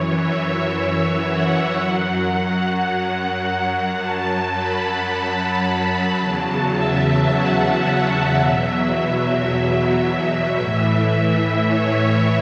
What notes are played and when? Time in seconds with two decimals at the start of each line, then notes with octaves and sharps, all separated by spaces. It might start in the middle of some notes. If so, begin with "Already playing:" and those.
Already playing: F#2 E3 C#5
0.15 E5
1.24 F#5
1.79 F#2 F#3
2.34 F#5
2.89 F#5
3.44 F#5
3.99 F#2 F#3 A5
4.54 B5
5.09 B5
5.63 A5
6.18 E2 C#3 F#3 A5
6.73 E5
7.28 F#5
7.83 F#5
8.37 E2 B2 F#3 E5
10.02 E5
10.56 A2 E3
11.67 C#5